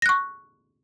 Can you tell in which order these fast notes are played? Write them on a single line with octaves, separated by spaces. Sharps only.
A#6 F#6 C#6